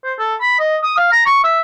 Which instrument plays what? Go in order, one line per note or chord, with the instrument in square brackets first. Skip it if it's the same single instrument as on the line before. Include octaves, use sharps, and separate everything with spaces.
[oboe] C5
A4
B5
D#5
D#6
F5
A#5
C#6
E5